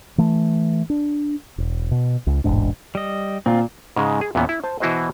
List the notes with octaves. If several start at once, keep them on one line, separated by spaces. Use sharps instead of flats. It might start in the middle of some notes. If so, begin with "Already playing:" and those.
E3 A3
D4
E1
B2
C#2
E1 A1 G#2 D4
G3 D#5
A#2 C4 F4
G#2 C#3 G#3
G#4
E2 A#2 E3 B3 C#4
E4
C5 A5
B2 E3 E4 F#4 C5 D#5